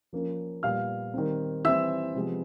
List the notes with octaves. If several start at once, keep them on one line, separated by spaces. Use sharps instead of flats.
F3 A#3 C#4
A#2 G3 B3 F5 F6
D#3 G3 C4
E3 G3 C4 E5 E6
C3 F3 G#3 B3